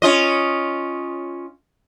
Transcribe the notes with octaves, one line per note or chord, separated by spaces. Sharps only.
C#4 F4 D#5